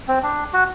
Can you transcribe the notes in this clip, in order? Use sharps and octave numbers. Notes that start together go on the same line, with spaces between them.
C4
D4
F#4